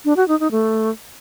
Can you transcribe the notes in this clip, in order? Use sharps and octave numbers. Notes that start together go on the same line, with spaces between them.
D4
F#4
D#4
D#4
A3